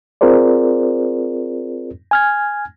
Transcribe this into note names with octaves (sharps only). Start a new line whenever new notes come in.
C4 F4 G#4 A#4 C5 D5
G#5 F6 G#6